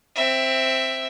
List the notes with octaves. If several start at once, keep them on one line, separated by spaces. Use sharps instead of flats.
C4 E5